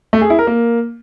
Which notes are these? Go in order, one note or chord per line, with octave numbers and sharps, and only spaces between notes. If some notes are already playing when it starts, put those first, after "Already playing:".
A3
G#4
E4
A#4
A#3